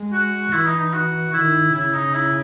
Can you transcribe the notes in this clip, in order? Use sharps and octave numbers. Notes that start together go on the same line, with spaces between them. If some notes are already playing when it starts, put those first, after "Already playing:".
Already playing: G#3
F#4
E3 E4
D#4
D#4
F#4
D#3 E4
C#3 E4
D#4
E4